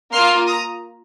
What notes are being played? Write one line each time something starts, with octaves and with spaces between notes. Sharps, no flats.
A#3 F4 C6 F6
A#5 D#6